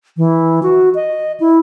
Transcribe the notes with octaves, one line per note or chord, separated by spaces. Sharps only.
E3
F#4
D#5
E4